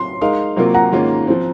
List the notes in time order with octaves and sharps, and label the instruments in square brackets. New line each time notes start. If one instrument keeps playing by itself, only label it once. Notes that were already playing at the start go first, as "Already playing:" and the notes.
Already playing: [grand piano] C6
[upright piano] G#3 D#4 A#4 F5
C3 F#3 A#3 F4 A#4
[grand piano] F#5 A#5
[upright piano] G#2 D#3 A#3 C#4 F4
F3 C4